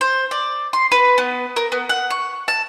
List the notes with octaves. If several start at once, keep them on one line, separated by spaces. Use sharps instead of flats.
C5
D5
C6
B4
B3
A#4
B3
F#5
C#6
A5